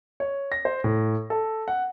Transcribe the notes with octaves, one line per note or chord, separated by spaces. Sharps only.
C#5
A#6
C5
A2
A4
F#5